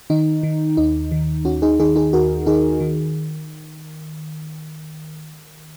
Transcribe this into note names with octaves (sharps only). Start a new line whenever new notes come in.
D#3 D#4
D#3
D#2 D#4
D#3
D#2 C#4 F#4
D#4 G#4
D#3 D#4 G#4
D#4 G#4
D#2 F#4 A#4
D#3 D#4 G#4
D#3